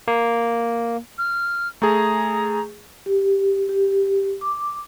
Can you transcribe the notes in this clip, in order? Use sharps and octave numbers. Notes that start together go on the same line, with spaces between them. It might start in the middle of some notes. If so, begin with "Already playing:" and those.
A#3
F6
A3 G#4 A#5
G4
G4
D6